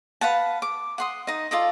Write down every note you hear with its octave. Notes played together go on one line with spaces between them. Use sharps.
B4 F5 F#5 A5
D6
F#5 C6 D#6
D#4 D#5
F4 A4 D5 D#5